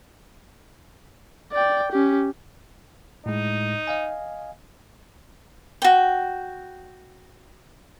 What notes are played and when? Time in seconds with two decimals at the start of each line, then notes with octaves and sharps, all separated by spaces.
1.53 D5 G5
1.92 C#4 G4
3.26 A2 G#3 D#4
3.87 D#5 F5 G#5
5.82 F#4 G5